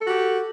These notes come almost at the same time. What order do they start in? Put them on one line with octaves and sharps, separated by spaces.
A4 F#4 G4